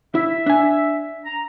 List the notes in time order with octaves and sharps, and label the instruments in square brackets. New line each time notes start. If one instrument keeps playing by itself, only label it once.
[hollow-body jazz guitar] E4 [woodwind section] E5
[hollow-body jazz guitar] D4 G#5
[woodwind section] A#5